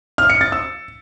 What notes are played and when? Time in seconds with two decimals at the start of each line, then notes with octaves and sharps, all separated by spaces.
0.18 F6
0.30 C#7
0.41 A6
0.52 E6